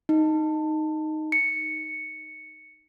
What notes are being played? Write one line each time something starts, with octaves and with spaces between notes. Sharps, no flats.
D#4
C#7